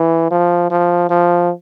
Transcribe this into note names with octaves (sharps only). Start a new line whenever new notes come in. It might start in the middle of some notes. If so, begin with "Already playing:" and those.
Already playing: E3
F3
F3
F3